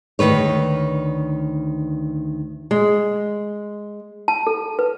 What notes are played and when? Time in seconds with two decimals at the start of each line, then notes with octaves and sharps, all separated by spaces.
0.19 D2 A#2 D#3 B4 C#5
2.71 G#3
4.28 A5
4.47 A4
4.79 B4